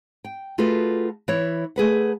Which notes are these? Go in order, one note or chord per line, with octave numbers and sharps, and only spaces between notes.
G5
A3 F4 F#4 G#4 A4 B4
E3 E4 C#5
A3 G#4 B4 F#5